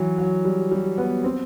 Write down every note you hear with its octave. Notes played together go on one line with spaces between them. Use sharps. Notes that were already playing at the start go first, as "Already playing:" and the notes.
Already playing: E3 F#3
F#3
G3
G3
B3
C4